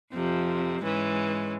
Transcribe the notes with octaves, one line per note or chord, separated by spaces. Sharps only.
F2 C3 F3
G#2 E3 G#3 C#4